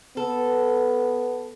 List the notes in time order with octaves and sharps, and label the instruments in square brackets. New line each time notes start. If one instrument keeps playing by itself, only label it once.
[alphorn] B3 [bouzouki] A4